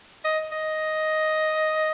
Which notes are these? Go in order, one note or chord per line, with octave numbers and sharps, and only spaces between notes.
D#5
D#5